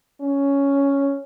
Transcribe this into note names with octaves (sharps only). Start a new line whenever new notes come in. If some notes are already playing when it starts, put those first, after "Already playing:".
C#4